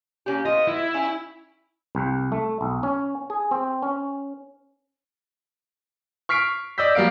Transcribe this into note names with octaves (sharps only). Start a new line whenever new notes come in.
A#3 C#4 G4
B3 F4 D#5
E4
C#4 E5 G5
C2
A3
B1
C#4
G#4
C4
C#4
C#6 F6 B6 C7 D7
D5 D#5 E6 G6 B6
F#3 G3 A#3 F5 D7